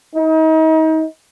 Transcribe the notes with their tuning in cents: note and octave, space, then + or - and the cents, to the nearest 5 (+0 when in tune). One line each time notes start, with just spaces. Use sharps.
D#4 +35